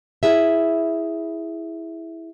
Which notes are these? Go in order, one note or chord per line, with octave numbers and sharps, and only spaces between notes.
E4 G#4 E5